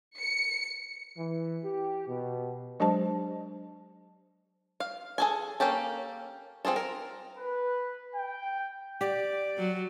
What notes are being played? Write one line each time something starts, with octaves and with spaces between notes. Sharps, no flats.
C#7
E3
G4
B2
F#3 G#3 D4 G4 C5 A5
F5
G#4 A4 G#5
A#3 C#4 G4 A4
C4 F4 G#4 A4
A#4
B4
G5
G4 D5
F#3